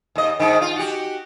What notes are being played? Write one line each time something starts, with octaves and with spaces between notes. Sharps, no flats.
D#2 D#5
G#2 D#3
F4
F#4 G4